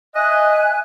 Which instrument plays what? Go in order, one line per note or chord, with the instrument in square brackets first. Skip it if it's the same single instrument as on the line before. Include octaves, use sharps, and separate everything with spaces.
[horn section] D#5 [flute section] E5 G#5 F#6